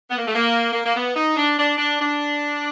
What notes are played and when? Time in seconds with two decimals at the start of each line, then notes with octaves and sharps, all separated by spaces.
0.10 B3
0.18 A#3
0.27 A3
0.35 A#3
0.73 A#3
0.84 A#3
0.95 B3
1.15 D#4
1.37 D4
1.58 D4
1.78 D4
2.00 D4